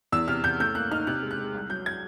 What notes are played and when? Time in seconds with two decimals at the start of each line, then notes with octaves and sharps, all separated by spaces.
0.12 E2 E6
0.28 C3 F6
0.44 E2 G6
0.60 A2 G6
0.75 A#3 F#6
0.91 D#4 F6
1.07 C3 F#6
1.23 G#3
1.31 F#6
1.39 G#3
1.54 C2
1.70 F#3 G6
1.86 G#6